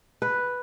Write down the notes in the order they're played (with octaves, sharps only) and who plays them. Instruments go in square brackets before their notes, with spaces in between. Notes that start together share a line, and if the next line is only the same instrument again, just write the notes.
[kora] B4